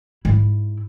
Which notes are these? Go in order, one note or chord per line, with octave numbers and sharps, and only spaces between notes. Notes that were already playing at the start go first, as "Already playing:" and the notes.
G#2 E4